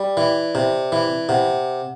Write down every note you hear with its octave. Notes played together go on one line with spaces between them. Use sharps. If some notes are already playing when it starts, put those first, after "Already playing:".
Already playing: G3 D5
E3
C3
E3
C3 F#5